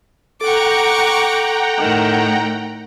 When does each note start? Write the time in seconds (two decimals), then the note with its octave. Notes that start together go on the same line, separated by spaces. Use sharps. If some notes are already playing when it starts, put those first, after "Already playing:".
0.41 A4 F#5 G5 A#5 C#6 D6
1.79 A2 D#3